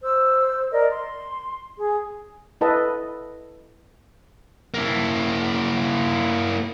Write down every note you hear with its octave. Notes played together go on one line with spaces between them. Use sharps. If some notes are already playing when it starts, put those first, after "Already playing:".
C5 E6
A#4 D5 D#5
C6
G#4
E4 A4 B4 D#5 F#5 A5
A#3 E4